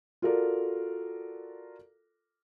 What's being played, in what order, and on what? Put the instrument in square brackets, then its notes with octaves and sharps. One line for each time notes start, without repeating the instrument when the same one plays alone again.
[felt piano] F4 F#4 A4 A#4 D5